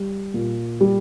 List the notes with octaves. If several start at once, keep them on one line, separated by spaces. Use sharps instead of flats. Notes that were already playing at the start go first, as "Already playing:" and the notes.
Already playing: G3
A#2
G3